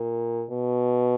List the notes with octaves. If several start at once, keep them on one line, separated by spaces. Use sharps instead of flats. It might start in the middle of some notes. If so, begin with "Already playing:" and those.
Already playing: A#2
B2